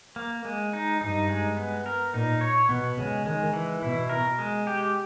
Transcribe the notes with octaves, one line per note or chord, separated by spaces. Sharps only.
A#3
G#3
D#4
G2 D#4
G#3
B3
A#4
A#2 D#4
C#5
B2 B3
C#3 G#3
D#3 G#3
E3
B2 E4
A#4
G#3
G4